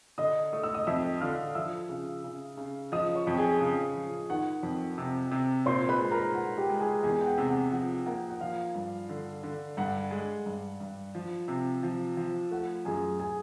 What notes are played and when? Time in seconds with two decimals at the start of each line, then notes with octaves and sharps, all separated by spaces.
0.18 D3 D#5 D#6
0.53 A3 D#6
0.64 E6
0.74 D#5 D#6
0.87 F2 E5 E6
1.21 D3 F5 F6
1.55 F3 E5 E6
1.89 C#3
2.24 C#3
2.57 C#3
2.92 F3 D#5 D#6
3.15 C#5 C#6
3.27 F2
3.37 G#4 G#5
3.61 C#3
3.94 F3
4.29 D#3 F#5
4.63 F2
4.98 C3
5.31 C3
5.66 A#2 C5 C6
5.89 B4 B5
6.00 G#3
6.11 A#4 A#5
6.35 A#2 F#5
6.57 G4 G5
6.70 G#3
6.80 G#4 G#5
7.03 E2 G#4 G#5
7.21 G5
7.26 F#5
7.38 C3
7.49 F#5
7.71 F3 F#5
8.06 A#3 F#5
8.30 F#5
8.40 F3 F5
8.75 G2
9.09 D3
9.43 D3
9.77 G2 F#5
10.11 G#3
10.46 G2
10.80 G2
11.15 F3
11.48 C3
11.83 F3
12.17 F3
12.51 A3 F#5
12.85 F#2 G#4 G#5
13.20 G#4 G#5